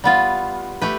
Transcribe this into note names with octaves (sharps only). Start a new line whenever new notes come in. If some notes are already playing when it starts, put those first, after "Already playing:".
G3 B3 F4
A3 G4 B4